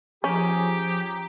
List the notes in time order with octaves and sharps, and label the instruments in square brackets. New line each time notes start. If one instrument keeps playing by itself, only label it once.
[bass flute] F3 [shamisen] C#4 [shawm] G4 [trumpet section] G#4 A#5